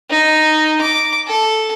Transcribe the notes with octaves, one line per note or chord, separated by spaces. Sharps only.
D#4
D6
A4